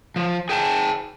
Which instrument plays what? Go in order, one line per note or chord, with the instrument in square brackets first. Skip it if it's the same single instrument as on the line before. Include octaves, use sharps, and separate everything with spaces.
[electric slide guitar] F3
G#4 G5 A5